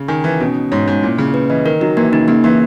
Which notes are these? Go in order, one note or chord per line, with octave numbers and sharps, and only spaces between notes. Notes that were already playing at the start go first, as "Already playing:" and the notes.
Already playing: C#3
D#3 G#5
E3 D#4
B2 C#4
C#4
G#2 C#5
G#2 C#4
A#2 E4
C#3 C#4
B4
E3 D#5
D#3 A#4
F#3 D#4
E3 A#3
C#3 D#4
C#3 A#3
E3 A#3